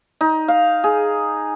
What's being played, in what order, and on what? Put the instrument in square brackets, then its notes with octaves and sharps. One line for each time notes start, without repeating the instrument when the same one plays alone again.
[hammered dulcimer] D#4
F5
G#4